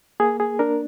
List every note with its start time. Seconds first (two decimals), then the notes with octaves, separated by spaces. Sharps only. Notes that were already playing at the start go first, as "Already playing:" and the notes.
0.20 A#3 G#4
0.40 G#4
0.59 D4 A#4